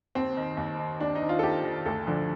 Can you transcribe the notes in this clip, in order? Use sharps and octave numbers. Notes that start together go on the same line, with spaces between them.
D#2 C4
D#3
D#2
D#3
D#2 D4
D#4
D#3
F4
A4
D#2 G4
D#3
D2 A4
D3 F3